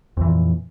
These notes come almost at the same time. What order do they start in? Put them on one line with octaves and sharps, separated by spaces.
F2 E3 A#2